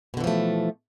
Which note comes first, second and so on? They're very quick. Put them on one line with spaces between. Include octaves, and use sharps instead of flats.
B2 D3 E3 F3 A3